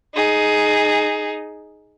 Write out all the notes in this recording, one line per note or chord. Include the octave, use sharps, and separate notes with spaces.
D#4 G#4